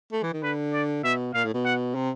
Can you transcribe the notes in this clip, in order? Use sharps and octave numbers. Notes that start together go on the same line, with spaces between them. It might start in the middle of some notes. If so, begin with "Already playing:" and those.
A3
E3
D#3
D3 B4
D5
B2 E5
A#2 F5
A2
B2
F#5
C3